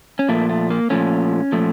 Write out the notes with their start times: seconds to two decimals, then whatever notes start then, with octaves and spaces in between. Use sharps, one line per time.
0.19 C#4
0.28 A#2 F3 A3 A#3
0.49 A3
0.70 A#3
0.90 A#2 F3 A3 C#4
1.52 A#2 F3 A3